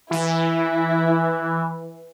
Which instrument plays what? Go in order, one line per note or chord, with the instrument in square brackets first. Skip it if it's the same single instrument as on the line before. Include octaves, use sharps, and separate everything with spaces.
[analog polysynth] E3 [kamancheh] E4